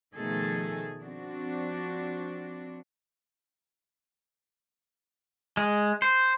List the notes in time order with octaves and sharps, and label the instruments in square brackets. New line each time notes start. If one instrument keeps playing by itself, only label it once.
[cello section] B2 D#3 F3 A3 G#4 A4
F3 C4 D4 F#4
[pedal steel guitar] G#3
C5